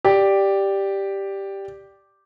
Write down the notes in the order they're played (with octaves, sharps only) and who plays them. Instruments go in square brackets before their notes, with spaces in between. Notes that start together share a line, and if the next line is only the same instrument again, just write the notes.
[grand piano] G4 D5